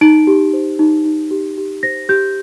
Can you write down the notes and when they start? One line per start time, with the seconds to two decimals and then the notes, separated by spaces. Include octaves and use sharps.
0.01 D#4 D7
0.27 G4
0.53 C5
0.79 D#4
1.05 D#4
1.31 G4
1.57 G4
1.83 C5 A#6
2.09 G4 G6